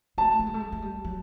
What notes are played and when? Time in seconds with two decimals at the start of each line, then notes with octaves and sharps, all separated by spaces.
0.18 A3 A5
0.39 A3
0.47 G#3
0.54 A3
0.60 G#3
0.72 G#3
0.82 G3
1.05 F#3